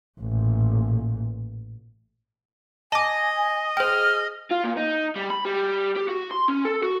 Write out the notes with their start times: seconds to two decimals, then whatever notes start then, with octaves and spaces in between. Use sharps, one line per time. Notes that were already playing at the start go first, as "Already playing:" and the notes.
0.20 A1 A#2
2.92 D#5 G#5 A5 D6
3.77 G#4 C5 G5 F6
4.51 F4
4.64 A#2
4.77 D#4
5.16 G3
5.30 B5
5.45 G3
5.96 G4
6.08 F#4
6.31 C6
6.48 C#4
6.65 A4
6.83 F#4